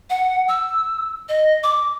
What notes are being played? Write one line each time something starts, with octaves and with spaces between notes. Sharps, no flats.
F#5
E6
D#5
D6